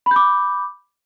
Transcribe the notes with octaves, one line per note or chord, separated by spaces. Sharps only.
B5 D6 G6